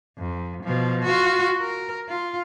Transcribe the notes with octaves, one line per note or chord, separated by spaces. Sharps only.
F2
B2 F3
F4 F#4
A#4
F4